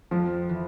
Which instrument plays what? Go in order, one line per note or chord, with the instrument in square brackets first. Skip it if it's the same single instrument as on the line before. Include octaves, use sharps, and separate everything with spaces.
[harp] F2 [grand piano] F3
[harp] E3